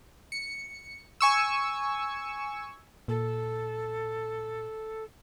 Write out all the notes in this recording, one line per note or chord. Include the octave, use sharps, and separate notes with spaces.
C#7
G#5 C#6 E6
A#2 A4